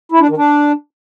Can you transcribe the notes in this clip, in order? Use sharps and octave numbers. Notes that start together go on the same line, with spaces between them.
E4
D4
D#3
D4